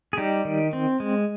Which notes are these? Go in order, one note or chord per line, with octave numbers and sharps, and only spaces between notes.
G#4
G3 D#4 G4
D#3
C4
G#3